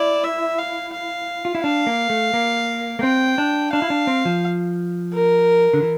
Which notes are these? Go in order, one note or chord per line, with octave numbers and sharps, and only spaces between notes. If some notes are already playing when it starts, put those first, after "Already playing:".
Already playing: E4 D5
E5
F5
F5
F4
E4
D4 F5
A#3
A3
A#3
A#3
C4 G5
D4
D4 F5
E4
D4
C4
F3
A#4
D3
E3